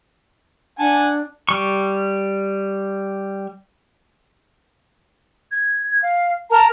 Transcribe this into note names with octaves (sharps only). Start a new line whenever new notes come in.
D4 F#5 G#5 A5
G3 C#6
G#6
F5
A#4 A5 A#5